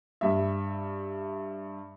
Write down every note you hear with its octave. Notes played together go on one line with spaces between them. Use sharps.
G2 E5